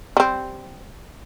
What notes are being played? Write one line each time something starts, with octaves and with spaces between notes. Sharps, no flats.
G3 C4